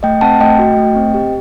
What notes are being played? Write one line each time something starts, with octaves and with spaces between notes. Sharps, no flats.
A3 D#5 G5
C4 F#5 A5
A3 D#5 G5
F#4
A3
C4
G4